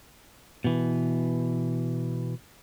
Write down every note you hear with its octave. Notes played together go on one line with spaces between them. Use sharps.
B2 E3